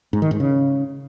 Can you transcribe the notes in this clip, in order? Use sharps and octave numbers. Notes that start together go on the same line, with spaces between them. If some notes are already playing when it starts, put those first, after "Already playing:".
G#2
D#3
G#2
C#3